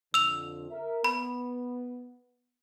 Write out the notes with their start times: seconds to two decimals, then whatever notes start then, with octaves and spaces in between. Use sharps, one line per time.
0.14 F2 D3 E6 F7
0.71 A#4 E5
1.04 B3 B5